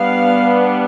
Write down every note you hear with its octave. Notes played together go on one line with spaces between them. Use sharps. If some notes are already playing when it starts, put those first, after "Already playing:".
Already playing: G3 B3 D4 F5